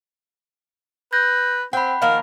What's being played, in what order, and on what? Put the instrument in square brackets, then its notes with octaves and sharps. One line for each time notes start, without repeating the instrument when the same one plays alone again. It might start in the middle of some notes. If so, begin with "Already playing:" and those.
[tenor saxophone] B4 [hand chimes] G6 A#6
[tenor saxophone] C4 [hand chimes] F#5 B5 [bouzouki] G5
[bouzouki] D#3 F3 A#3 [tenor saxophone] A#4